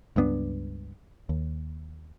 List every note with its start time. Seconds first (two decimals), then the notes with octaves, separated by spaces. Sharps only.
0.16 C#2 G2 B3 D4
1.29 D#2